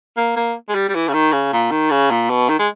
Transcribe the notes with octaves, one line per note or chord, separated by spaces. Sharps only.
A#3
A#3
G#3
G3
G3
E3
C#3
D#3
C#3
A#2
D#3
C#3
A#2
B2
D#3
G#3